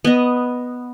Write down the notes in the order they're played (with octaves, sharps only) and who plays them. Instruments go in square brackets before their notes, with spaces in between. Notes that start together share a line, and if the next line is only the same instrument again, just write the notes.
[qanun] B3 D#5